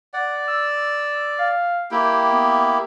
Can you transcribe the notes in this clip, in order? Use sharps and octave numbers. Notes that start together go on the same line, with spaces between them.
D5 F#5
E6
F5
A#3 E4 G4 G5
B3